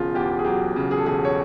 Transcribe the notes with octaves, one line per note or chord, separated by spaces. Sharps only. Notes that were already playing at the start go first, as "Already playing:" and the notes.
Already playing: E1 C#3 F4
E2 G4
G#4
F#3 G4
C#3
G#4
A4
E1 G#4
C#5